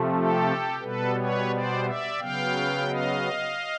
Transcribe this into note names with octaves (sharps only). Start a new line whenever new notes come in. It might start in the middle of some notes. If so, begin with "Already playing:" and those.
Already playing: C3 F3 A3
G4 A4
B2 G3 B3 A4 B4
B4 C#5
C5 D5
D5 E5
C#3 F#3 B3 F5 G5
D#5 F5